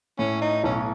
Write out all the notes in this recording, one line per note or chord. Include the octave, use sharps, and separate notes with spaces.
A2 C#4
D#4
B1 C#4